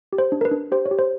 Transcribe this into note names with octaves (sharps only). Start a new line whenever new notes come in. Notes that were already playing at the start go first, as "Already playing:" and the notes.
G4
C5
D4
A#4
B4
D4
G4 C5
C#5
G4
C5